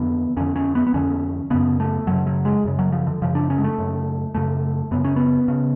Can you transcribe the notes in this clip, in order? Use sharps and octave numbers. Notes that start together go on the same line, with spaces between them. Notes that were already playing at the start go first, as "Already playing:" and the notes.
Already playing: F2 D3 B3
F2 D3 C#4
C#4
B3
B3
F2 D3 C#4
F#2 C#3 B3
A3
F#2 C#3 F#3
F#3
G#3
F#2 C#3
F#3
F3
D3
F#2 C#3 F3
D4
C#4
G#3
A3
F#2 C#3
F#2 C#3 A3
F#2 C#3 B3
C#4
B3
C#3